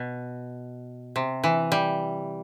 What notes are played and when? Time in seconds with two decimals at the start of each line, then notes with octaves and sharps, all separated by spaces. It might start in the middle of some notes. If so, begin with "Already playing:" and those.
Already playing: B2
1.16 C3
1.44 E3
1.72 G3